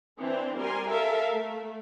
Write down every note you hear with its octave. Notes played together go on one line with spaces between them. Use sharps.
E3 C4 D4 C5
G3 A#4 G#5 C6
A4 A#4 E5 F5
A3